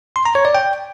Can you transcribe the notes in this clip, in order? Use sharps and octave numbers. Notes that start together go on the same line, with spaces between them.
C6
A#5
C#5
D5
G5